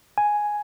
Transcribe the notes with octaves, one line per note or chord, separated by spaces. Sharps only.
G#5